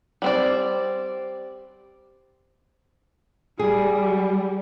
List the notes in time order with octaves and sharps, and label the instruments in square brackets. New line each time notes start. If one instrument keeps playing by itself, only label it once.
[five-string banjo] G3 C4 D5
[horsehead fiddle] G3 [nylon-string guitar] G#4